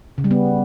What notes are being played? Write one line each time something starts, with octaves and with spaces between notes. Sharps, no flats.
C#3
G3
B3